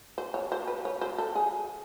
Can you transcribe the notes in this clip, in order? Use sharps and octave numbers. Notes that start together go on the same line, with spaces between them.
C5
C#5
C5
B4
C#5
C5
A4
G#4